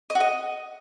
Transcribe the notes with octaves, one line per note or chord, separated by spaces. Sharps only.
D#5
F#4
D#5